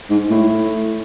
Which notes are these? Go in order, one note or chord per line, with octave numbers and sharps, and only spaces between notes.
G#2
A2